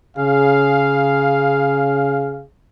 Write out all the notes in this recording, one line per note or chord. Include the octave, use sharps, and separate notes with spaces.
C#3 G#4 F5